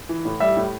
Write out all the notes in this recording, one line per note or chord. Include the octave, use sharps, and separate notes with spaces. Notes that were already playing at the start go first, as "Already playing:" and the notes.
E3
A2
G3 E5
A2